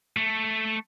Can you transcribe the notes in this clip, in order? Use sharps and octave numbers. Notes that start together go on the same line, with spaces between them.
A3